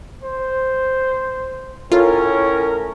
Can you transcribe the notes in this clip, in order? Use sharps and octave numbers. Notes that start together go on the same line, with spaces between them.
C5
A2 C#4 F4 A#4